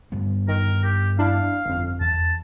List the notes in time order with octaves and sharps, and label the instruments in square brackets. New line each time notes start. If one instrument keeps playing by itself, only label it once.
[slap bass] G2 G3 B3
[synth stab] D#3 [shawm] A#4
[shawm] G4
[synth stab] D4 E4 [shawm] F5
[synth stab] G1 F2
[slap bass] E2 [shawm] A5